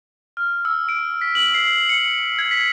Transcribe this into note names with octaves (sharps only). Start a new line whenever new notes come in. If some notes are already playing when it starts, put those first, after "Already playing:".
F6
E6
D7
B6
F#7
C7
C#7
G#6
B6